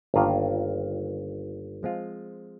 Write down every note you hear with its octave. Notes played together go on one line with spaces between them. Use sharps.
G1 G2 D#3 A#3 F4
F3 G#3 C4 F4